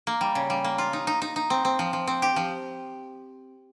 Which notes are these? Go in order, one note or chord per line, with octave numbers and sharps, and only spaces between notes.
A#3
G3
C#3
G3
A#3
F4
D#4
D#4
D#4
D#4
C4
C4
F3
F3
C4
G4
F3